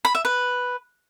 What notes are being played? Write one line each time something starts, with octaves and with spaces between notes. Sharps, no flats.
B5
E5
B4